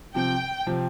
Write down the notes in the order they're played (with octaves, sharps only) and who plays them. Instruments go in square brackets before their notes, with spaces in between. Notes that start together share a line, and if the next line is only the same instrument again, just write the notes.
[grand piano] C3 F3 C4 [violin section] G5
[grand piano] C3 F3 C4